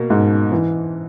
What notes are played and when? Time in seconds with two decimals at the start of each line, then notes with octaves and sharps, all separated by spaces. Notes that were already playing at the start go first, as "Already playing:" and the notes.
Already playing: B2 A#3
0.10 G#2
0.52 E3